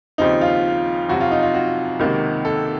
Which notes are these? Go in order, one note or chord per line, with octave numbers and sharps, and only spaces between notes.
D#2 C#3 F3 C4 D#4
F4
F2 C3 F#3 F#4
F4
D#4
F4
F#4
C#2 C3 D#3 A#3
A4